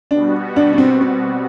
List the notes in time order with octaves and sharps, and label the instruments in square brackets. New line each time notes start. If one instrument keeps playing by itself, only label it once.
[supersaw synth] B2 G3 B3 F#4 [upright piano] D4
[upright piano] D4
D4
C4
C4